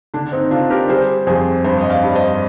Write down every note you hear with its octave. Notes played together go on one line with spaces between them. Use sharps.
D3 D4
C4 D#4
D3 D4 F4
G4 A#4
G3 G#4 C5
F2 G#4 C5
G2 G#4 C5
D#5
D5 F5
G2
D5
C5 D#5